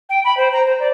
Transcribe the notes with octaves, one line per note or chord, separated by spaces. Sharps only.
G5
B5
C5
A#5
C5
D5